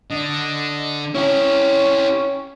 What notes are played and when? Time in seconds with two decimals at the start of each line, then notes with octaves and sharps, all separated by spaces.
0.11 D3 D#5
1.15 C#4 E4 G4